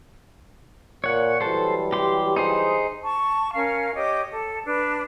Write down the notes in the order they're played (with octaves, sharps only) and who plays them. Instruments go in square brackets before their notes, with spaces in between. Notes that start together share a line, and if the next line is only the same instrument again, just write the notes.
[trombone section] A#2 [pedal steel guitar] C#5 F#5
[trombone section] E3 F#3 G3 [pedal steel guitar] A4 C5
[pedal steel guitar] G4 C6
D#4 G#4 C5
[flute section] A5 C#6
C#4 A#4 F5
G4 C#5 D#5 D6
A4
D4 B4